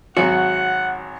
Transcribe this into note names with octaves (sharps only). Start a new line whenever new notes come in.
G#1 F#3 F#4 F#5